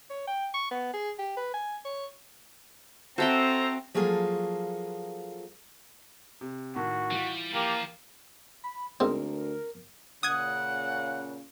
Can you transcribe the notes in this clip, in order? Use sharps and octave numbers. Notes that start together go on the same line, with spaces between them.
C#5
G5
C#6
B3
G#4
G4
B4
G#5
C#5
C4 F#4 A4 C5 E5 G5 A#5
F3 F#3 A#3 F4 G#4 A4
C3
A2 D#3 A3 F#4
E3 G3 F4
F3 A#3 G4
B5
D2 G#2 C4 A#4
A#2 C#3 F#5 D#6 G#6